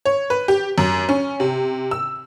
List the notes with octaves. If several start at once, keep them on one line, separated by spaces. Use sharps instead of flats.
C#5
B4
G4
F#2
C#4
C3
E6